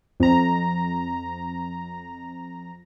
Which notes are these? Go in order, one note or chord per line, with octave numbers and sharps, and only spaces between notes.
F2 A#5